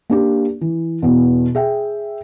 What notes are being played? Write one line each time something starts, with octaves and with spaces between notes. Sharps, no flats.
A#3 D4 G4
E3
E2 B2
G#4 E5 G5